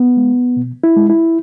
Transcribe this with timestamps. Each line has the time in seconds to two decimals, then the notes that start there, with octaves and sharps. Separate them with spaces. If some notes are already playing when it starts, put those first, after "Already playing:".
Already playing: B3
0.17 G#3
0.57 B2
0.84 E4
0.96 G#3
1.09 E4